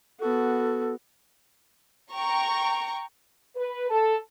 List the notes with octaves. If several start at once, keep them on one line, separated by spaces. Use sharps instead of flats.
B3 F#4 A4
G5 A#5 C#6
B4
A4